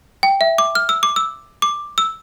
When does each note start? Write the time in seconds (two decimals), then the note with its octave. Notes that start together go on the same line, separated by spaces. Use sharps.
0.23 G5
0.41 E5
0.58 D6
0.75 F6
0.89 E6
1.03 D6
1.16 E6
1.62 D6
1.98 E6